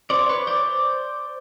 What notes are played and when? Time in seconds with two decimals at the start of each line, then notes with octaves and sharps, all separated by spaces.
0.10 C5 D5
0.29 B4 C#5
0.47 C5 D5